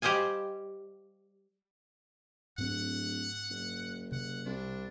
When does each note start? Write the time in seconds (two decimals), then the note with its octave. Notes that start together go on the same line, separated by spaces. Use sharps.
0.02 G3 G4 C5 D#5 F5 G#5
2.58 D1 G#2 C4 F#5
3.50 F#1
4.12 C3 F#5
4.46 C2 D4